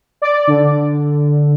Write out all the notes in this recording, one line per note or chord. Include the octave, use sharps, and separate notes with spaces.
D5
D3